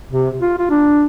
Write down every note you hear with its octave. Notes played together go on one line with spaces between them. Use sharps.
C3
F4
F4
D4